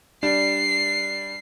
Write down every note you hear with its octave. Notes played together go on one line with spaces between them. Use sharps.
G3 D4 C7